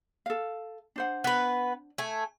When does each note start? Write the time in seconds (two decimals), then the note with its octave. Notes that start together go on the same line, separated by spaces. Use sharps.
0.26 A4 F5
0.96 D4 C5 F#5
1.24 B3 B4
1.98 A3 G#5